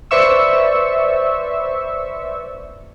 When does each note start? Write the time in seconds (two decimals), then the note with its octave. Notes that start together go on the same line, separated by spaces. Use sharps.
0.11 B4 C5 D5 E5 C#6 E6